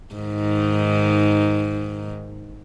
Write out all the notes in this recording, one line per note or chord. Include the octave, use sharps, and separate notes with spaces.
G#2 D#3